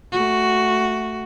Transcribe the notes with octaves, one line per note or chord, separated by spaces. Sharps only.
A3 F#4